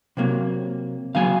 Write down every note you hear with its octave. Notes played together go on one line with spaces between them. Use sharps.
C3 F#3 A#3
C#3 F#3 A#3 F5 G#5